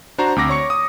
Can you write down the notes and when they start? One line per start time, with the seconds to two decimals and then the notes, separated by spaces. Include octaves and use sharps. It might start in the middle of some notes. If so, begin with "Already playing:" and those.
0.18 D4 F#4 C5 A#5
0.36 D2 C4 D6 A#6
0.49 C#5 C#6 C#7
0.70 D#6